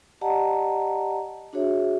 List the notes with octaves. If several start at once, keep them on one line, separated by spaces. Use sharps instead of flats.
G4 D5 D#5 F#5 A5 A#5
D4 F#4 G#4 C#5 E5